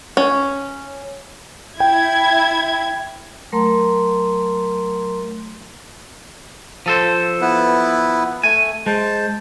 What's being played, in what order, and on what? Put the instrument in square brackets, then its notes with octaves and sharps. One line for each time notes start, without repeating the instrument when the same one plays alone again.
[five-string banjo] C#4
[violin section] E4 G#6 [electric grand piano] G5
[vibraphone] F#3 A3 A#4 A#5 C6
[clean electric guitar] F3 A4 C5
[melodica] B3 E4 B4
[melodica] A3 [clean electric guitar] G#5
[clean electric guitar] G#3 [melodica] C5 A5